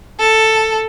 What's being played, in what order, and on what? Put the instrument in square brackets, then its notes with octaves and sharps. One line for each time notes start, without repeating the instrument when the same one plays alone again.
[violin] A4